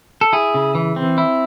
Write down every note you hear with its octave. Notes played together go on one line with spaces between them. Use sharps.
A4
E4 G#4
C#3
E3
C4
E4